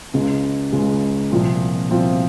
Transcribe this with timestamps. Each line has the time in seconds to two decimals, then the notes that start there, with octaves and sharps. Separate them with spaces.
0.13 C#2 C#3 G#3
0.72 C#2 C#3 G#3
1.31 C2 A#2 F3 C4 F4
1.90 C2 A#2 F3 C4 F4